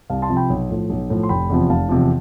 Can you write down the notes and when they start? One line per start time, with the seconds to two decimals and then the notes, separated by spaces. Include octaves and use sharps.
0.10 C2 F5 A5
0.22 A5 C6
0.30 C3 F3
0.37 G5 B5
0.50 B1
0.70 A2 F3
0.90 B1
1.10 A2 F3
1.23 C6
1.29 F1 G5 B5
1.50 E2 C3 F3
1.69 F1 F5 A5
1.89 E2 C3 F3